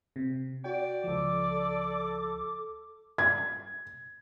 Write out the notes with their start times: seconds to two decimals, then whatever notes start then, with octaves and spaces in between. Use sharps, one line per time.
0.16 C3
0.64 F#4 D5 G5
1.04 C#2 F3 A4 D6
3.18 G#6